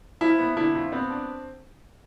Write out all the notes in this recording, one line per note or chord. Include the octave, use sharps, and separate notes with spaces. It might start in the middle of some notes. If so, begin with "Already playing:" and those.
F3 E4
B3
D3 E4
F2
B3 C4
D4